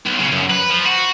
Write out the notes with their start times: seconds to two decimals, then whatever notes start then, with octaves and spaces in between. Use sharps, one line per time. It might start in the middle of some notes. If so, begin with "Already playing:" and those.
0.06 B1
0.19 C#3
0.32 F#2
0.50 B4
0.70 F3
0.85 F#4